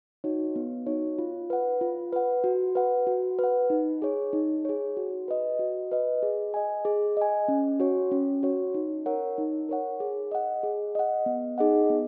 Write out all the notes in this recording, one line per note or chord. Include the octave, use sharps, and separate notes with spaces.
D#4 F#4 C#5
B3
D#4 F#4 C#5
F4
B4 F#5
F4
B4 F#5
F#4
B4 F#5
F#4
B4 F#5
D#4
G#4 C#5
D#4
G#4 C#5
F#4
B4 D#5
F#4
B4 D#5
G#4
D#5 G#5
G#4
D#5 G#5
C#4
F#4 C#5
C#4
F#4 C#5
D#4
A#4 C#5 F#5
D#4
A#4 C#5 F#5
G#4
D#5 F#5
G#4
D#5 F#5
B3
D#4 G#4 D#5 F#5
B3